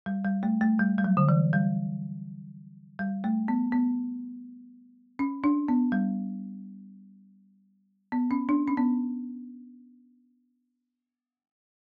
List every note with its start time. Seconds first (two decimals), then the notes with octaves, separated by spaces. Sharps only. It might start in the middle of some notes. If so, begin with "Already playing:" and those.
0.06 G3
0.24 G3
0.43 A3
0.61 A3
0.79 G3
0.98 G3
1.04 F#3
1.17 D3
1.29 E3
1.53 G3
2.99 G3
3.24 A3
3.48 B3
3.72 B3
5.19 C#4
5.44 D4
5.68 B3
5.92 G3
8.12 B3
8.31 C#4
8.49 D4
8.67 C#4
8.77 B3